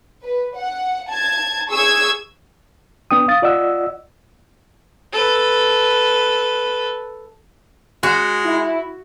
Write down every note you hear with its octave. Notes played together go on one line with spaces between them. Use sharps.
B4
F#5
A5 G#6
G#4 C#6 E6 G#6
B3 D4 G5 D#6
F5 D#6 A6
F4 D5 D#5 F#5 E6
A4 B4
G#3 F#4
E4